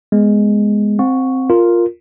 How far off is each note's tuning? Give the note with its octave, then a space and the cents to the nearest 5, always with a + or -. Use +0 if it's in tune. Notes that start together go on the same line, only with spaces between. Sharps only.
G#3 +0 B3 +0
C4 +0 F#5 -40 C#6 +0
F4 +0 A#4 -5